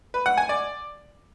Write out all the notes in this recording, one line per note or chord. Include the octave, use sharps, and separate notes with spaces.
B4
F#5
G#5
D5